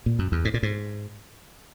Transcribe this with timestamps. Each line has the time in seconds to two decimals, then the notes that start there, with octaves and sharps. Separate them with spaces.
0.06 A#2
0.19 F#2
0.32 E2
0.45 G#2
0.54 A#2
0.63 G#2